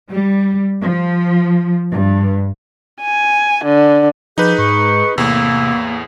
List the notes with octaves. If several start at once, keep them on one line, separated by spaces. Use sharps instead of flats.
G3
F3
G2
G#5
D3
F3 D#4 G4 G#4 B4
G#2 C#6
E2 A2 C3 A#3 E4